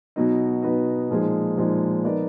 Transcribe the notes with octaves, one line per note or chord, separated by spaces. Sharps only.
B2 F#3 B3 D#4
B2 F#3 B3 D#4
A#2 F3 G#3 D#4 G#4
A#2 F3 G#3 D#4 G#4
F3 B3 D#4 A#4 D5